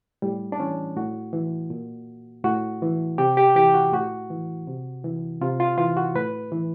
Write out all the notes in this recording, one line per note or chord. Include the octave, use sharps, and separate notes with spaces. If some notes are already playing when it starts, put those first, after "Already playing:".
A2 G3
D4
E3 C#4
A2 F#4
E3
A#2
A2 F#4
E3
C3 G4
G4
E3 G4
F#4
A2 F#4
E3
C3
E3
C3 F4
F4
E3 F4
F#4
A2 B4
E3